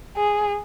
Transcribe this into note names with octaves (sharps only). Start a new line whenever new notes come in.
G#4